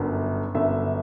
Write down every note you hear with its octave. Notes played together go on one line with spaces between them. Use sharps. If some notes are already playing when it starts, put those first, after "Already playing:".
Already playing: G1 F#2 D3
G1 F#2 D3 E5